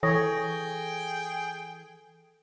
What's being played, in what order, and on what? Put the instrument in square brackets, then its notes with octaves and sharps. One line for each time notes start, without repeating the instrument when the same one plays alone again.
[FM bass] E3 [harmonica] G#4 G5 [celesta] A4 D#6 A#6 [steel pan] C#5